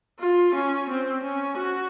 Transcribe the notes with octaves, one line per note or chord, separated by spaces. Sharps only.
F4
C#4
C4
C#4
F#4